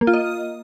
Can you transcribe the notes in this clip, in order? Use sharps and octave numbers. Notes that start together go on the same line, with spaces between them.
A#3
F4
D#5